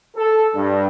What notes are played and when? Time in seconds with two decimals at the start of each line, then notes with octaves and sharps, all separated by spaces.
0.16 A4
0.56 G2